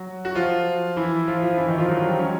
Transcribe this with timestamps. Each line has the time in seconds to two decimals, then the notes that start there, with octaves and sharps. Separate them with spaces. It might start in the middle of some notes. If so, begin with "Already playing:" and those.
Already playing: F#3 F#4
0.25 F#4
0.35 F3 F4
0.96 E3 E4
1.27 F3 F4
1.42 F3 F4
1.58 E3 E4
1.68 D#3 D#4
1.78 F3 F4
1.88 F#3 F#4
2.03 G3 G4
2.19 C#4 C#5